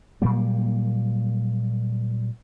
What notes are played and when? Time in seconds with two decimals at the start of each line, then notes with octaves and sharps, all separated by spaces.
0.22 A#2 F#3 G3 A#3